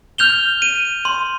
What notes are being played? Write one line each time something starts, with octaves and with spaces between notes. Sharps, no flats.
F6 G6 F7 G7
D#7
C6